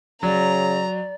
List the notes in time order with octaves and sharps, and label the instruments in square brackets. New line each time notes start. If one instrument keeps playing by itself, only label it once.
[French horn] C#3 [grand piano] F#3 [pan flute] D5 [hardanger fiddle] A#5